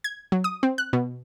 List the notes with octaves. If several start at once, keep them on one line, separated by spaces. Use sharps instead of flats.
G#6
F#3
D#6
C4
F#6
B2